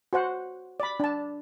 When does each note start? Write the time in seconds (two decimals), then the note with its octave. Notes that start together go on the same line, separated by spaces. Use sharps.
0.13 F#4 C5 F#5
0.80 D5 B5
1.00 D4 A5